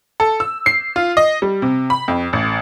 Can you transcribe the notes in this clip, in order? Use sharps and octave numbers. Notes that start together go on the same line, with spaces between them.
A4
E6
C7
F4
D#5
G3
C3
B5
F2
A1